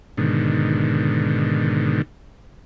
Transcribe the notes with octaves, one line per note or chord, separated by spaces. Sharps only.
G#2 B2 D3 D#3